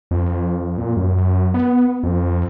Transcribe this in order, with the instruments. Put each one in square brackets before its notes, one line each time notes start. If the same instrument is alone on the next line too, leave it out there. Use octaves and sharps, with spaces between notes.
[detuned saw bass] F2
A#2
F#2
B3
F2